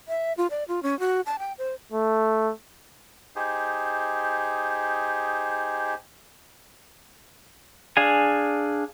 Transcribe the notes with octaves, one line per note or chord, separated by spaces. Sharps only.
E5
F4
D5
F4
C#4
F#4
A5
G5
C5
A3
D#4 G4 G#4 C5
D4 G#4 F5 G#5